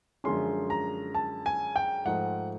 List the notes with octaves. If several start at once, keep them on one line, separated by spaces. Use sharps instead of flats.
F#2 D3 F3 G#3 C#4 C6
A#5
A5
G#5
G5
G#2 F3 A3 F#5